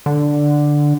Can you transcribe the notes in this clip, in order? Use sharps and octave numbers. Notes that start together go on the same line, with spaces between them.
D3